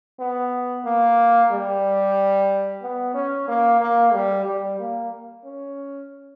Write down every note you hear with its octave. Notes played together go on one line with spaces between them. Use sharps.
B3
A#3
G3
B3
C#4
A#3
A#3
G3
G3
A#3
C#4